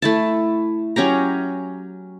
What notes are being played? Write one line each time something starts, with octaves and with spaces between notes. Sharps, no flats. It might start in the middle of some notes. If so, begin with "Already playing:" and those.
A3 E4 A5
F#3 C#4 G4 A#5